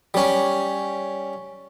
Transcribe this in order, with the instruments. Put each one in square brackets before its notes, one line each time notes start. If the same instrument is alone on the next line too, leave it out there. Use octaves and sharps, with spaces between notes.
[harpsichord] G3 C#4